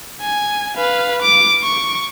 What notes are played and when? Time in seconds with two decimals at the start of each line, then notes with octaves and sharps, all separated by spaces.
0.21 G#5
0.77 B4 F5
1.22 D6
1.62 C#6